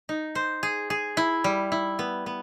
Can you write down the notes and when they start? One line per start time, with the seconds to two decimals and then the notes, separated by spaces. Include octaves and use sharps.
0.09 D#4
0.35 C5
0.63 G#4
0.90 G#4
1.17 E4
1.44 G3
1.72 E4
1.99 B3
2.26 B3